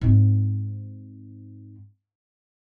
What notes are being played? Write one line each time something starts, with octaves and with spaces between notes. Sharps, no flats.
G#2 C4